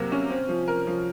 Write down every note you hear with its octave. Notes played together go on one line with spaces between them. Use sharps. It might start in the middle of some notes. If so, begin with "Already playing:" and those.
Already playing: C3 F#3 A#3
C#4
C4
F3
A#4
F3